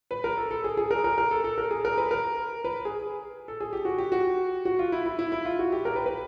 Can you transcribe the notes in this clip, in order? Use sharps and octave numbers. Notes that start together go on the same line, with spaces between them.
B4
A#4
A4
A4
G#4
G#4
A#4
A#4
A#4
A4
A4
A#4
G#4
A#4
B4
A#4
B4
G#4
A4
G#4
G4
F#4
G4
F#4
F#4
F4
E4
E4
E4
E4
F4
F#4
G4
A#4
B4
B4